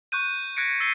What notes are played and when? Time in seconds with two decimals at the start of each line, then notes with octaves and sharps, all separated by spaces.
0.12 C#6 F#6 G6 D#7
0.56 F#6 G#6 A#6 B6 C#7 D7
0.80 E6 A6 B6 C7 D#7 G7